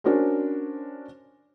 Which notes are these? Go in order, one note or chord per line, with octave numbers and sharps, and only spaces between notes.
C#4 D4 F#4 A#4 C5 C#5